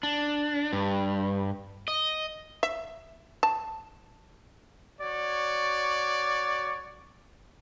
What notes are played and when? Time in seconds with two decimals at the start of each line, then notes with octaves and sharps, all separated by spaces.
0.03 D4
0.73 G2
1.88 D#5
2.63 E5
3.43 A5
5.01 F#4 C#5 D5